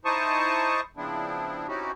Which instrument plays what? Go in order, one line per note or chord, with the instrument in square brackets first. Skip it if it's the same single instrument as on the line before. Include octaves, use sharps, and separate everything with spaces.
[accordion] D#4 E4 C5 A5 C#6 D#6
C#3 F3 B3 C4 D4 E4
C4 C#4 D#4 E4 F#4 G4